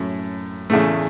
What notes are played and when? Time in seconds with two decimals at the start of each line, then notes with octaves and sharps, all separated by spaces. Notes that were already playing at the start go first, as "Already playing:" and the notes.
Already playing: F#2 A2 A3 C#4
0.70 E2 A2 C#3 A3